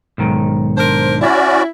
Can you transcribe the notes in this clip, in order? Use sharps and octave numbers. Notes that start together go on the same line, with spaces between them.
B1 G#2 D#3
D4 A#4 C5
C#4 E4 F#4 D5